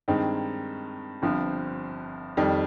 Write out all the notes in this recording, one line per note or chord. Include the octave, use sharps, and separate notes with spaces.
G2 D#3 G#3 C4 D#4
G1 G2 F3 C4
F2 D#3 G3